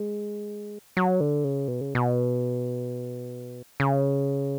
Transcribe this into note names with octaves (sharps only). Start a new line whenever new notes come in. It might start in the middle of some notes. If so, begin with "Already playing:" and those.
Already playing: G#3
F#3
D3
C#3
B2
C#3
B2
C#3